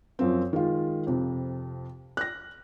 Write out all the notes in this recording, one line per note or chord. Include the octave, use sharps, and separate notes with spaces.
F#2 F3 C4
D#3 G#3 F4
F2 C3
F#6 A#6